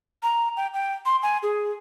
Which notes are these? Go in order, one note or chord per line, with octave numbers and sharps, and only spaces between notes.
A#5
G5
G5
C6
G#5
G#4